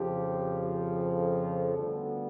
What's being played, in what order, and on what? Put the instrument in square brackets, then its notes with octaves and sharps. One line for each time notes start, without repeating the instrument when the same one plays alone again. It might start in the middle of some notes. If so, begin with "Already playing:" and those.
Already playing: [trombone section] F2 C#3 F3 G4
A4
D2 D3 G3 B3